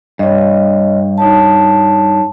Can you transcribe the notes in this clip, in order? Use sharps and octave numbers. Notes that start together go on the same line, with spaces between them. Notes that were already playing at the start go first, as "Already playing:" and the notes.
G2 C#5 D#5
D#4 C#5 A5